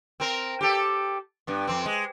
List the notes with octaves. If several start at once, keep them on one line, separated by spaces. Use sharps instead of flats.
C4 A#4
G4 A4
G2 B3
F2 C4
G#3